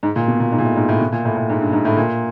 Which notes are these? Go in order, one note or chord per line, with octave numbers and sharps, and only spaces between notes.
G#2
A#2
B2
A#2
G#2
A#2
A2
G#2
A2
B2
A#2
A2
A2
G#2
G2
G#2
A2
A#2